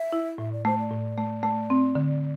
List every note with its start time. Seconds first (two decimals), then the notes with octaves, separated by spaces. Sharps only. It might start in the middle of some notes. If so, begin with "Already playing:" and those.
Already playing: E5
0.12 E4
0.38 A2 E5
0.52 D5
0.65 A3 C5
0.79 D5
0.91 A2
1.18 A3
1.43 A3
1.70 C4
1.95 D3